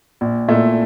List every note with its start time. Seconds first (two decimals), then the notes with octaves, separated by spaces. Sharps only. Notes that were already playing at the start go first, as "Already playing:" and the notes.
0.21 A#1
0.48 A#2 A3 E4